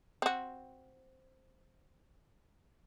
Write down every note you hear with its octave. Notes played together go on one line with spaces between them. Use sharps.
C4 F#4